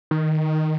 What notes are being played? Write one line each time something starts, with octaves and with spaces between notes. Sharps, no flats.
D#3